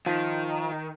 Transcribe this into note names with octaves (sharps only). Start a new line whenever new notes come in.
D#3 F3